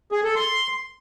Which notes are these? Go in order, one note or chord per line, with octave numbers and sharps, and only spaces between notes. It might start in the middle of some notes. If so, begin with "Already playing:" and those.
G#4
A4
C6